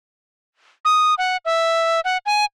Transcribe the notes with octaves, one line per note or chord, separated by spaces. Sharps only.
D#6
F#5
E5
F#5
G#5